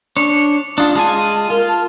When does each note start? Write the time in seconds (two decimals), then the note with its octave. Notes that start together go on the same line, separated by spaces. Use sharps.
0.17 D4 C#5
0.78 D4 F4 D#6
0.95 G#3 F4 G#5 A5
1.50 F4 A#4
1.68 A5